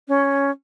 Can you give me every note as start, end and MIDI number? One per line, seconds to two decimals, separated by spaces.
0.08 0.50 61